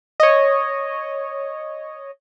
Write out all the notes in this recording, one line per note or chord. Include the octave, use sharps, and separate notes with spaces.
C#5 D#5